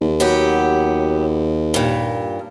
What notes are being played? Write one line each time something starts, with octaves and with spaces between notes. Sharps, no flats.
D#2
F#3 B3 G4
G2 A#2